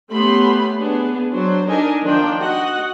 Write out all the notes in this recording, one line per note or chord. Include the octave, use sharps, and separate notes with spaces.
A3 B3 C#4 G4 B5 C6
B3 D4 G#4
F#3 D4 C5
D4 D#4 A4 A#4 D#5 G#5
D#3 F3 D4 F4 G5
F#4 D#5 F#5